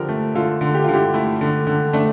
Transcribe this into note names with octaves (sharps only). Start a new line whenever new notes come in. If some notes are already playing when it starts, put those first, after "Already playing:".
Already playing: D3 F3 G4 A#4
A3
D3 F4 A4
D3
G4
F4
D3 E4 G4
A3 E4
D3
D3
A3 D4